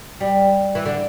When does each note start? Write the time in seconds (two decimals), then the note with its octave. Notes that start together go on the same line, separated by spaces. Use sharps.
0.20 G3
0.75 E3
0.86 D3